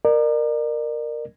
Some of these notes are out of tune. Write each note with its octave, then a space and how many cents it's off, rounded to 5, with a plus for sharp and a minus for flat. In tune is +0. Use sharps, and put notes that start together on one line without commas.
A#4 +0 D5 +40